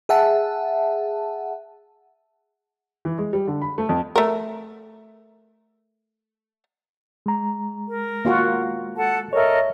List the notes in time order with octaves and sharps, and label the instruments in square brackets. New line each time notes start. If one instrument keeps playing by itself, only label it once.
[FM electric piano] G#4 E5 F#5 A5
[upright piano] E3
G#3
G3
D3
B5
A3
F2
[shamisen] A3 A#4
[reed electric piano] G#3 A#5
[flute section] A#4
[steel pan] A#3 F4 F#4
[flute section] A4 F#5 A5
[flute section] A4 A#4 D#5 [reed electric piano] C#5 E5